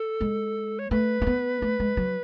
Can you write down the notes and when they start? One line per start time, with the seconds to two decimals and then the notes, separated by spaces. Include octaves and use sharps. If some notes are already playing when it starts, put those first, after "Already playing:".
Already playing: A4
0.21 G#3
0.79 C#5
0.91 A3 B4
1.22 A3
1.27 B3
1.62 A3
1.80 G#3
1.97 F#3